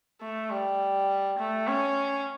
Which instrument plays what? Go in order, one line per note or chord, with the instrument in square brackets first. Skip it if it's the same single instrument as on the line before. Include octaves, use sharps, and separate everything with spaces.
[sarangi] A3
G3
A3
C#4